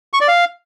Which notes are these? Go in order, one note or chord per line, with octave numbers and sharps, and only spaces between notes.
C#6
D5
F5